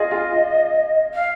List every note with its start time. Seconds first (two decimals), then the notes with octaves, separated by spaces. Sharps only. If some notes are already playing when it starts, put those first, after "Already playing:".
Already playing: F4 G#4 D#5
0.11 F4 G#4
0.32 F4
1.13 F5